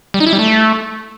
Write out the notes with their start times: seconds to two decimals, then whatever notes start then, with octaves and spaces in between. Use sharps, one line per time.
0.14 G3
0.20 D#4
0.27 E4
0.33 G3
0.39 A3